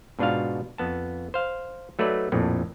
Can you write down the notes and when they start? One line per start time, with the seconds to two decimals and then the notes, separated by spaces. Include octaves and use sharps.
0.19 G#2 B2 D4 F4 F#4 F5
0.78 F2 B3 A5
1.34 C5 F5
1.99 F#3 A3 D#4 B4 D5
2.32 A#1 F2 A2